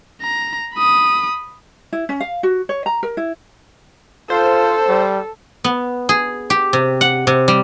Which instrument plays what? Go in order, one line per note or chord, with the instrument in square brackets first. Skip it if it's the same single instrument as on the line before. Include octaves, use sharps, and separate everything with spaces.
[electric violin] A#5
B5 D#6
[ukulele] E4
C#4
F5
F#4
C#5
A#5
A#4
E4
[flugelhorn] F4 [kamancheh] A4 [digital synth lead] C5
[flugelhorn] G3
[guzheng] B3
G#4
G4
C3
F#5
C3
G3